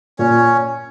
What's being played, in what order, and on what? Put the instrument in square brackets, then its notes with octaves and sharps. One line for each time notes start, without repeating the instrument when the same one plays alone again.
[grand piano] A#2 [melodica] C#4 C#5